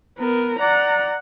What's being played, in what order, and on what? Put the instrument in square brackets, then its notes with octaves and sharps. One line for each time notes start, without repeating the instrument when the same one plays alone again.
[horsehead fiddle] B3 A#4
[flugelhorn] D5 [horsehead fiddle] F#5 A#5